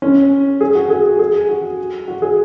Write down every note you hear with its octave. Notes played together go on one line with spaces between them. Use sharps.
C#4
G#4
F#4
G#4
G#4
F#4
F#4
G#4